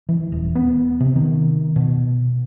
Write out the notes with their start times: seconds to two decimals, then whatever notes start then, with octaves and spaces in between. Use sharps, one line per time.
0.09 E3
0.32 D#1
0.55 B3
1.00 C3
1.16 D#3
1.76 B2